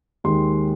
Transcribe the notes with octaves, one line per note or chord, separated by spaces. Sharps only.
D#2 D#3 G#3 C6